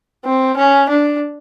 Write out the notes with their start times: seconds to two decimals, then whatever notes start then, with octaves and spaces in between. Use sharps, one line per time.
0.25 C4
0.57 C#4
0.89 D4